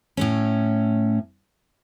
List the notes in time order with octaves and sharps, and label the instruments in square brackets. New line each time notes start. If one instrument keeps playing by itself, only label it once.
[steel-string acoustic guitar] A2 A3 C#4